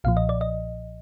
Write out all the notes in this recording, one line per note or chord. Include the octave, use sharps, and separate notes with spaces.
B1 A#2 F3 F5
D#5
D5
D#5